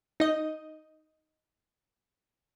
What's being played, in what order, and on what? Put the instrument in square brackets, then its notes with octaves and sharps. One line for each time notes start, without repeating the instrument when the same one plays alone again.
[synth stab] D#4 D#5